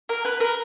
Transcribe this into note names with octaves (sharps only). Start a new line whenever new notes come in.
A#4
B4
A#4